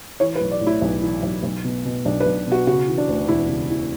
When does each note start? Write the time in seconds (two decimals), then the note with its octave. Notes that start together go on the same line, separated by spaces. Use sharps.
0.20 E3 C#5
0.35 B4
0.41 B1
0.51 D5
0.61 A2
0.67 E4
0.82 B1
1.02 E3
1.23 B1
1.43 B1
1.64 B2
1.85 B2
2.05 B1 D4
2.20 B4
2.26 B1
2.47 B2 F#4
2.67 C#3 F#4
2.88 E3
2.98 D4
3.08 D2
3.28 E1 E4
3.49 C#3
3.70 E3